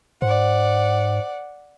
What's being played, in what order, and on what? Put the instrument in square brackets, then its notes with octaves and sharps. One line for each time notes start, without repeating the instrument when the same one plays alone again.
[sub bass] G#2 [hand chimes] C5 [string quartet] D5 F#5